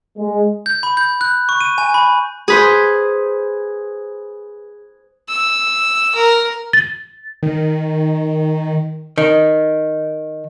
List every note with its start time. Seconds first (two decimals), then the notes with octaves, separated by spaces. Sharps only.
0.17 G#3
0.66 G6
0.83 B5
0.97 G6
1.21 F#6
1.49 C#6
1.61 D#7
1.78 G#5
1.94 B5
2.48 G#4 B4 C5
5.29 E6
6.16 A#4
6.73 A6
7.43 D#3
9.18 D#3